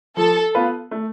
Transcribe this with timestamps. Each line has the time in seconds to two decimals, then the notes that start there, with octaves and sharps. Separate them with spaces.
0.17 F3 A4
0.55 B3 F4 B4
0.91 A3